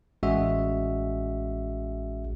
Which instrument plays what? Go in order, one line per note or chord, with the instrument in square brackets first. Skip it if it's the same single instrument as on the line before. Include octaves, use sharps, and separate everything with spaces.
[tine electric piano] A1 G#3 C#4 F#4 G#4 E5